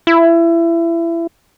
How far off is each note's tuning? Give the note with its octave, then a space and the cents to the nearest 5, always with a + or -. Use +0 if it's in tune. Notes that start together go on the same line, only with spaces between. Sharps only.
E4 +25